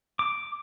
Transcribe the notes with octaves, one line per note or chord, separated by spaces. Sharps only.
D6